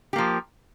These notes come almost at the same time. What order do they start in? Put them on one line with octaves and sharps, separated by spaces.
G4 A#3 F3